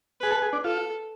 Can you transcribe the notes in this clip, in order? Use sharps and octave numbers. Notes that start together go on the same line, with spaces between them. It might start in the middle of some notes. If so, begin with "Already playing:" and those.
G#4 B4
A4
G#4
D4
F4 A4